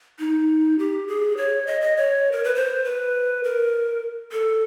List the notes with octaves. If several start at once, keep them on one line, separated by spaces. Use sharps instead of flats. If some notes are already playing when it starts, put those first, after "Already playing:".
D#4
G4
G#4
C#5
D#5
D#5
C#5
A#4
B4
C5
B4
A#4
A4